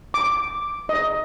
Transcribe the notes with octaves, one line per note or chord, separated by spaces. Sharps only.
D6
D#5